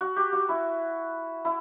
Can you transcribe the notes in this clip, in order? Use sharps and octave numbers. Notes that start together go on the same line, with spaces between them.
F#4
G4
F#4
E4
E4